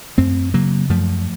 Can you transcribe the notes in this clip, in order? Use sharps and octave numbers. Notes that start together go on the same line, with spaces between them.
F#2 A3 C4
C#3 F#3 A#3
F#2 F3 A3